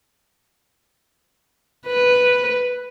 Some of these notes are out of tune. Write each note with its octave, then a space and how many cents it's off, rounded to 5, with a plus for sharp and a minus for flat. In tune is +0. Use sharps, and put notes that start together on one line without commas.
B4 +0